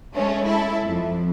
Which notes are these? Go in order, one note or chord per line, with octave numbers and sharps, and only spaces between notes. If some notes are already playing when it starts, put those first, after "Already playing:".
G#3 A3 C#4
E4 A4
F2